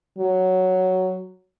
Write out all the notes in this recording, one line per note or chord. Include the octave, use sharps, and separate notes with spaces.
F#3